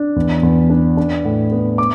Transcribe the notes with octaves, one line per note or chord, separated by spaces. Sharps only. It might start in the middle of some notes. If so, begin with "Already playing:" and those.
Already playing: D4
E2
E2
D4
D4
A2
B3
D6